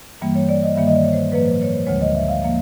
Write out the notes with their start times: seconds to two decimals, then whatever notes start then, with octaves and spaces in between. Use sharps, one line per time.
0.21 G2 E3 G3 A#3
0.35 C#5
0.49 D5
0.63 D#5
0.76 G2 D#3 G3 A#3 E5
0.87 D#5
0.95 D5
1.04 C#5
1.13 C5
1.31 A2 F3 A#3 B4
1.45 C5
1.62 C#5
1.73 C5
1.87 D2 D3 F3 G#3 C#5
2.01 D#5
2.15 E5
2.28 F5
2.43 F3 A#3 F5